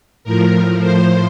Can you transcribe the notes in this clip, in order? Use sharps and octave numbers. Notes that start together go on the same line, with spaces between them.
A2 F3 A#4
C5